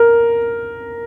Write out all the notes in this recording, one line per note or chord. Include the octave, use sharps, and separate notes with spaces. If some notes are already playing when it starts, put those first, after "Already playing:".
Already playing: A#4